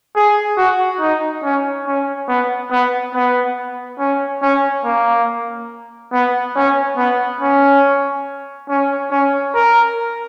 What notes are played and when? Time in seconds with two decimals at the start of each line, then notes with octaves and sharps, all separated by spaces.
0.15 G#4
0.57 F#4
1.00 D#4
1.43 C#4
1.86 C#4
2.28 B3
2.71 B3
3.14 B3
3.99 C#4
4.42 C#4
4.84 A#3
6.12 B3
6.55 C#4
6.97 B3
7.40 C#4
8.69 C#4
9.11 C#4
9.54 A#4